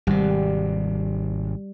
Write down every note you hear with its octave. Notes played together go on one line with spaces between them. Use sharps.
G#1 C3 G3